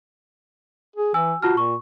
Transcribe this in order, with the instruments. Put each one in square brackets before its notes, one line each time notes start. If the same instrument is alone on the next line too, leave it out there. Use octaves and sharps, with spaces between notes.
[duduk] G#4
[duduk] E3 [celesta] G#5 E6
[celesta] F4 A5 F6 [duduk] F#4
[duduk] A#2 [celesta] C#6